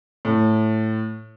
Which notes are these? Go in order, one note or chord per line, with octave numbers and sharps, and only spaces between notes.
A2